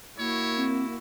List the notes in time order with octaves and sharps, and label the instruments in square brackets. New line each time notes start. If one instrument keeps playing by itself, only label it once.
[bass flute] A#3 [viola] E4 F#4 [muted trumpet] C#5
[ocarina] C4